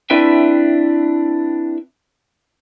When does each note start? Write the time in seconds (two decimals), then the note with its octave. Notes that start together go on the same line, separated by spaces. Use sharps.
0.10 C4 D4 E4 B4 E5 G5